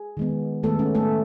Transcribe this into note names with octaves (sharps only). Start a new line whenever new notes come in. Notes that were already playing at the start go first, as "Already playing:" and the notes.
Already playing: G#4
D#3 G#3 B3
D#3 G#3 A3 B3 A4
C#4
A3 A4